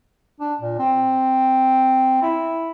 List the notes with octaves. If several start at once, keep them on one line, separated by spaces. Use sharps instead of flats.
D4
A#2
C4
E4